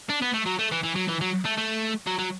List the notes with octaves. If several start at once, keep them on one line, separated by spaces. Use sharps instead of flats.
D4
B3
A3
F#3
A3
E3
E3
F#3
E3
F#3
A3
A3
F#3
F#3